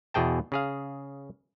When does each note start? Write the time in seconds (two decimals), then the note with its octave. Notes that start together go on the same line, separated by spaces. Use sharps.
0.14 E2 B2 G#4 G5 A5
0.52 C#3 G#4 F5